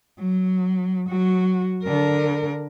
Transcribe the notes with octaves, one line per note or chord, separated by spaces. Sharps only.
F#3
F#3 F#4
D3 A#4